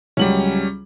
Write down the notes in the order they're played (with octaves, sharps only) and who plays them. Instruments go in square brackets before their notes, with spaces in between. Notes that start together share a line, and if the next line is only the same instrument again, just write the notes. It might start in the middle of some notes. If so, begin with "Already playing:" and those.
[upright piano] C#2 F#3 F#7 [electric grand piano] G3 C#4